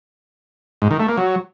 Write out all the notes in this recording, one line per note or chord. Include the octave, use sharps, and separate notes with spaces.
G#2
D#3
A3
A#3
F#3